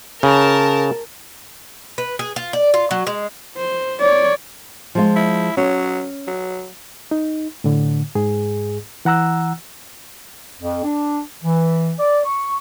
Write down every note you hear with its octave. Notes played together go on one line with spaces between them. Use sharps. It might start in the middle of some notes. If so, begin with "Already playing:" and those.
C#3 A#4 A5
B4
G#4
F4
D5
F4
F#3
G#3
C5
C#5 D5
F3 G#3 F4
E4
F#3 C#4
F#3
D#4
A2 D3
G#2 G#4
E3 F#5 A#5 E6 F#6
F2
D4
E3
D5
C#6